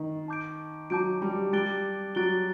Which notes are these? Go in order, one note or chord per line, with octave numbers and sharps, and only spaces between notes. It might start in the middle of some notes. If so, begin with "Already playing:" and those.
Already playing: D#3
A5 D6 G6 D7
F#3 A5 D6 G6 D7
G3
G3 F#6 A6 D7 G7
F#3 F#6 A6 D7 G7